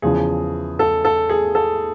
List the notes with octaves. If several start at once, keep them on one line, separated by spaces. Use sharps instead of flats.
E2 C#3 F3 G#4
A4
A4
G#4
A4